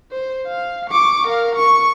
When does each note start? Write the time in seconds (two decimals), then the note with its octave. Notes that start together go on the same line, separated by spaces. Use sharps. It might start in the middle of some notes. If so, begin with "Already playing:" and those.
0.12 C5
0.48 F5
0.90 C#6 D6
1.27 A#4 F5
1.56 C#6